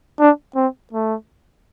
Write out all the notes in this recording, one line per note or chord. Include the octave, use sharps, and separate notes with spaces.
D4
C4
A3